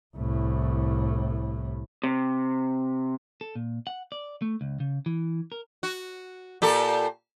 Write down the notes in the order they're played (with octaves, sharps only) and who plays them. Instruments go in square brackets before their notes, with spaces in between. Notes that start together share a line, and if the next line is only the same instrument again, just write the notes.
[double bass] C2 A2
[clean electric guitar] C3
A4
A#2
F#5
D5
A3
C#2
C#3
E3
A#4
[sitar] F#4
A#2 G4 A4